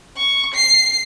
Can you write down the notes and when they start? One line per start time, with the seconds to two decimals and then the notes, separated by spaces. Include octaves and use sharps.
0.16 C#6
0.54 C7